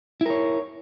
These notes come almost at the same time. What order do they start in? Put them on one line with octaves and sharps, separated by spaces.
E4 A#4 C#5